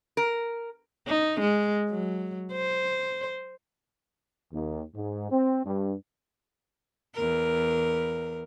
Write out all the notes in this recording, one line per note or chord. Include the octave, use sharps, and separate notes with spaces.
A#4
D#4
G#3
F#3
C5
D#2
G#2
C4
G2
E2 A#4